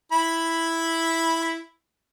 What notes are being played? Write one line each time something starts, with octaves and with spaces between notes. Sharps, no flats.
E4 B5